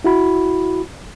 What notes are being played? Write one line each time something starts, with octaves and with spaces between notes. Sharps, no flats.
E4 F#4 B5